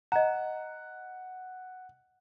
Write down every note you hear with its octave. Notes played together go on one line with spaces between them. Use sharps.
D#5 F#5 A#5